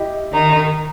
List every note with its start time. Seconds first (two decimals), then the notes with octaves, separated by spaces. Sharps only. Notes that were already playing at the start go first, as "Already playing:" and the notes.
Already playing: E4 G4 D#5
0.32 D#3 D#4